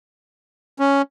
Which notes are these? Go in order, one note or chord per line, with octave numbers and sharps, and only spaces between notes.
C#4